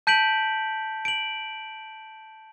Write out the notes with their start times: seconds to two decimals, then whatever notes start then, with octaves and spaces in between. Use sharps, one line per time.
0.07 A5 G6 B6 D7 F#7
1.05 D7 F#7